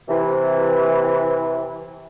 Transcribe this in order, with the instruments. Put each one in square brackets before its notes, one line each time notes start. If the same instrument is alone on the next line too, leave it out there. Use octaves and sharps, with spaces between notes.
[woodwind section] C3 E3